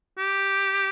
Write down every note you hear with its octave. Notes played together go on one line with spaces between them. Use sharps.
G4